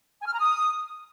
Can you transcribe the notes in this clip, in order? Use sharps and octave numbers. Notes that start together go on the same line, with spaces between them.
G#5
F6
A#5
D#6